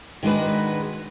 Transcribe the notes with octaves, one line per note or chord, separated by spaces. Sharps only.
D#3 G#3 D4 F#4 B4